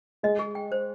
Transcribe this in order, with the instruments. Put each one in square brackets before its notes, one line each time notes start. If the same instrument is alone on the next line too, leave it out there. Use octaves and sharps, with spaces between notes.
[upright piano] G#3 [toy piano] D#5
[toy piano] G#4
G5
C5